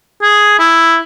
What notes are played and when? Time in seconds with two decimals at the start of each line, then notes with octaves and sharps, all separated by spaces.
0.22 G#4
0.59 E4